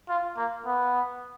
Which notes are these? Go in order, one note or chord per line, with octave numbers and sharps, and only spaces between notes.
F4
A#3
B3